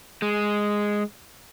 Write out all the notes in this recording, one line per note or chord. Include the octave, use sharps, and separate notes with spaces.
G#3